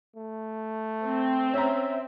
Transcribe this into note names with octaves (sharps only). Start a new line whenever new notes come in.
A3
C4
C#4 E5 A#5